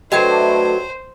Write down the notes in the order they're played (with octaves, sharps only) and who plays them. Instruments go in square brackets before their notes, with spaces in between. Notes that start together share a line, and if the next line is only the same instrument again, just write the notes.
[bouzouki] F#3 [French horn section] A3 D4 B4 [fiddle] C5 [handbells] D#5 G5 G#6